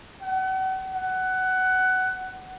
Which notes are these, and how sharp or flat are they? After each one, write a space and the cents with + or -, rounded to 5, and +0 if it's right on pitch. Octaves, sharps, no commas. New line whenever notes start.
F#5 +35
F#5 +15